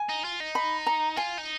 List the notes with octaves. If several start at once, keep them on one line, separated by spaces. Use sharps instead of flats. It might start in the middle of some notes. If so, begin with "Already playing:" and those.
Already playing: G#5
D#4
F4
D#4
B5
A#5
F4 G#5
D#4